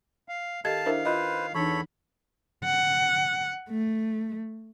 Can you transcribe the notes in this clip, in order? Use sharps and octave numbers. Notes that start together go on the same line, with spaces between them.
F5
D#3 G4 A4 D#5 F5 A5 G#6
D4 E4 A#4 C5 E5
F4 B4 C5 D#5
E2 E3 D4 D#4 A4 C#5 B5
F#5
A3